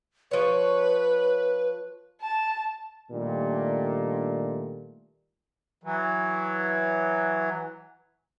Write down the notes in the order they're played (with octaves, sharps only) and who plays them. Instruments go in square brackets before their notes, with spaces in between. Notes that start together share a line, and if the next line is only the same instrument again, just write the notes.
[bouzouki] F3 C#5 [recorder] B4
[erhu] A5
[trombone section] A#2 D#3 G3 A3 D4
[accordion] E3 F#3